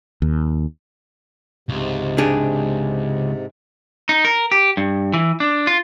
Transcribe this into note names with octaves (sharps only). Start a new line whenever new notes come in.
D#2
C#2 G#2 C3
D4 G4 G#4
D#4
A#4
G4
G2
E3
D4
F4